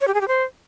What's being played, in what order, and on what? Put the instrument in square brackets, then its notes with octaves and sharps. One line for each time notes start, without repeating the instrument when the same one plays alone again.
[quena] C#5
G4
G#4
G4
C5